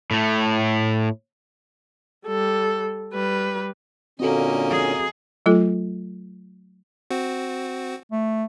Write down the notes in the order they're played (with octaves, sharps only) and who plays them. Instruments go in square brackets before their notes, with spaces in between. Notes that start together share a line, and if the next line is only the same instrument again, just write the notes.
[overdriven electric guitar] A2 A3
[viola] G3 A4
G3 B4
[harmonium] A#2 D3 C#4 [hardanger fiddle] A#3 D#5 [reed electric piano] C4 F#4 A4
[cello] G#4
[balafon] F#3 A3 F4 A4
[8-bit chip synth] C4 F#4
[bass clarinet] A3